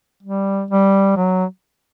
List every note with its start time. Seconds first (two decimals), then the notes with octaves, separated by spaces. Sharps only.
0.23 G3
0.71 G3
1.17 F#3